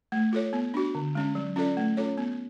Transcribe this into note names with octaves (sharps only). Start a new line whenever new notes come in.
A3
F4 A4 C#5
B3
D4 F#4
D3
G#3 C#4
F#3
C#4 F4 A4 D5
A3
C#4 F4 A4 C#5
B3